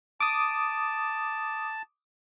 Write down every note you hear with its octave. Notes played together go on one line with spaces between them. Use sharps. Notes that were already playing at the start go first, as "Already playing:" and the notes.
A5 D6 D#6